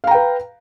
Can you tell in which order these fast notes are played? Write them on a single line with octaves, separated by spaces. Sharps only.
F5 A#5 G5 B4